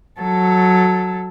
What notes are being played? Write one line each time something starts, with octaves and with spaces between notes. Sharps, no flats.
F#3 A4